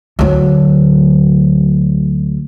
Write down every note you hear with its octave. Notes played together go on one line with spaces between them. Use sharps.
D2 F#3